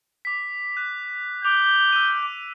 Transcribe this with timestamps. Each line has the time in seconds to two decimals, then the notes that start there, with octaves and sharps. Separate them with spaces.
0.25 D6 B6
0.77 F#6
1.45 D6 G6 F7
1.92 E6 D#7